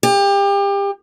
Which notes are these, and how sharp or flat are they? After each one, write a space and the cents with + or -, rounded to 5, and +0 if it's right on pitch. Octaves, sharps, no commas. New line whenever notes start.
G4 +30